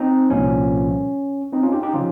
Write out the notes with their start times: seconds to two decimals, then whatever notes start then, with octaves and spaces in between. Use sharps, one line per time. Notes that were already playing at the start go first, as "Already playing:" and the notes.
Already playing: C4 D#4
0.30 C2 A#2 F3 C#4
1.53 C4 D#4
1.62 C#4 F4
1.72 D#4 G4
1.83 D#4 G4
1.93 C#3 F3 C#4 F4